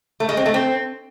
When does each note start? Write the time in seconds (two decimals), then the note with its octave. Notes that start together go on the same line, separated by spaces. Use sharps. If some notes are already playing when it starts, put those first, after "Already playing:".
0.20 A3
0.29 G#3
0.37 C4
0.46 A3
0.54 C4